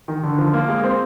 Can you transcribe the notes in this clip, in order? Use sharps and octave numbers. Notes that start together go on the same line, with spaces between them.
D#3
D3
F3
A#3
G#3
C4